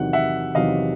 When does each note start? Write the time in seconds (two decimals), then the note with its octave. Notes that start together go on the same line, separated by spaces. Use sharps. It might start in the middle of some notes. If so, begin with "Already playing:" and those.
Already playing: E2 C3 D#3 F#3 F#5
0.13 E5 F#5
0.55 E2 C3 D#3 F#3 D#5 F5